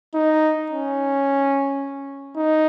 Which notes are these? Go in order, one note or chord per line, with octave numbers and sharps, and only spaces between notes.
D#4
C#4
D#4